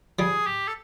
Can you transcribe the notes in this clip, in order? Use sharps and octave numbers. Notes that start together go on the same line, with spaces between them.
F3 G3 G#4
G4
A4